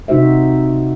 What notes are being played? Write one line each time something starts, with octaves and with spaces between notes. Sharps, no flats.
C3 D#4 F#4 C5 E5